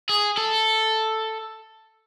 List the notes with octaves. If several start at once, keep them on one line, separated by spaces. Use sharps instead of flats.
G#4
A4